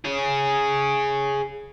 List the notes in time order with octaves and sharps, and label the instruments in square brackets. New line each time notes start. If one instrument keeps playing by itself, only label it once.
[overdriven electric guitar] G#4 C#5